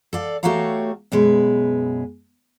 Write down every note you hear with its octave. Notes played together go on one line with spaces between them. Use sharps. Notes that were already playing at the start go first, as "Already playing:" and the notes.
A4 D5 F5
A3 F#4 G4 C#5 F5 A#5
F#2 B2 G#3 B4